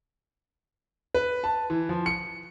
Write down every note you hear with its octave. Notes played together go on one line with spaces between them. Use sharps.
B4
A5
E3
F3
C#7